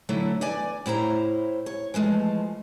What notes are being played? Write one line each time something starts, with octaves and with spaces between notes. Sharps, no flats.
D3 F#3 A3 E4
E2 D5 G#5
A2 E4 C5 A#5
C#5
E3 F3 G#3 A3